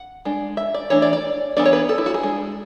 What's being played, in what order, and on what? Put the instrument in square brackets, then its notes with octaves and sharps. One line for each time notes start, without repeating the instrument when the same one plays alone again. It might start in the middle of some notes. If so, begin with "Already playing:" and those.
Already playing: [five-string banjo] F#5
G#3 D4
E5
D5
E3 A3 D4 C#5
D5
D5
E3 B3 D4 D5
C#5
B4
A4
E4
F#4
G#4
G#3 D4